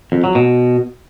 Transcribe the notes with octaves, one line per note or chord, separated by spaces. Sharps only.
F2
F#3
B2